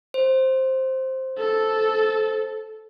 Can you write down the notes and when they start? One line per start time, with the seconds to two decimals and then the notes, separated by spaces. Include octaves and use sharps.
0.14 C5
1.38 A4